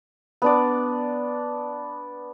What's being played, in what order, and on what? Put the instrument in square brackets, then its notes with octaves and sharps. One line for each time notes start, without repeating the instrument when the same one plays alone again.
[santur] B3 D4 D5